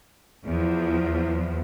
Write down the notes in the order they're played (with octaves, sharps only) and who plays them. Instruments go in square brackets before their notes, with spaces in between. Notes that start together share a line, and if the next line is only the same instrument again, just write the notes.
[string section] E2 F3